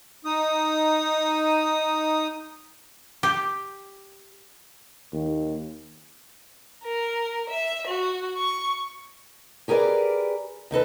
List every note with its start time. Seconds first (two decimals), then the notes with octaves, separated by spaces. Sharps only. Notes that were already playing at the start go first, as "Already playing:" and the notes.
0.25 D#4 D#6
3.23 G4
5.13 D#2
6.83 A#4
7.48 E5
7.88 F#4
8.37 C#6
9.68 G4 G#4 A#4 B4 D5
10.71 D#2 D#4 A4 B4